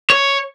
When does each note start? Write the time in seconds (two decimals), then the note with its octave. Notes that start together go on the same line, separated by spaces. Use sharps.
0.10 C#5